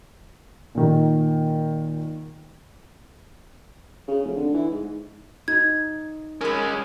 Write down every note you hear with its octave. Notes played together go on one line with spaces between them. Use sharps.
A#2 D#3
C#3
F1
D3
E3
G#2
D#4 G#6
G#3 C#4 A#4 B5